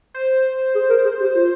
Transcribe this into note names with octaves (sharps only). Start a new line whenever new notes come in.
C5
G#4
A#4
G#4
G4
F4